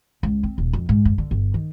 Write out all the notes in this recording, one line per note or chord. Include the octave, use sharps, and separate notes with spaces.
C#2
C4
D#1
F2
G#2
G2
D3
G1
D#3